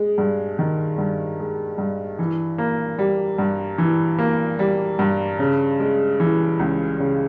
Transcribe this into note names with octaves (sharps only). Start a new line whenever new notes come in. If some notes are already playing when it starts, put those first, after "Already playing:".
Already playing: G#3
G2
D#3
G2
G#3
G2
E3
A#3
G3
G2
E3
A#3
G3
G2
C#3
G#3
E3
C#2
C#3